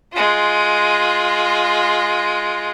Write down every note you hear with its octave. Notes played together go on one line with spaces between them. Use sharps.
G#3 F4